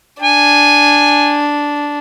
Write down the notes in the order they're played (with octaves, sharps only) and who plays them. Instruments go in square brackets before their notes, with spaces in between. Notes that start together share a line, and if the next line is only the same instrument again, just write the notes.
[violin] D4 [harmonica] G#5